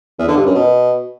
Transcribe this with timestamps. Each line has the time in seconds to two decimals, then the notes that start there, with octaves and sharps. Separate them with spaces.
0.19 E2
0.28 D3
0.37 G2
0.46 F#2
0.55 B2